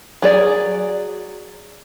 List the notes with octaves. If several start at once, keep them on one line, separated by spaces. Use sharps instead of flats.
F#3 G#4 D5